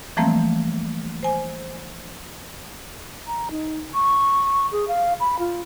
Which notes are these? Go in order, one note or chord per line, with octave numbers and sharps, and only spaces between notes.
E3 F3 G3 A3 A#3 C4
C5 G#5
A#5
D#4
C#6
G#4
F5
B5
F4